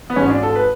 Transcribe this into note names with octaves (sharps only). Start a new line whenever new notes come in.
B3
G#1 G#2 G#3 C#4
D4
A4
B4